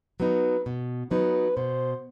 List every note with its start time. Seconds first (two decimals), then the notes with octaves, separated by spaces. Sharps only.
0.20 F#3 B3 D#4 B4
0.66 B2
1.11 F#3 B3 D#4 B4
1.56 B2 C5